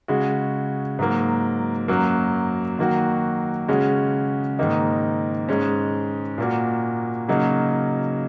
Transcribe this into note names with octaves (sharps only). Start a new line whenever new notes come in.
C#3 G#3 F#4
G#2 F#3 A#3
F#2 F#3 A#3
D#3 F#3 A#3 F#4
C#3 G#3 C#4 F#4
G#2 D#3 A#3 D#4
G#2 G#3 C#4
A#2 A#3 F#4
C#3 F#3 A#3 D#4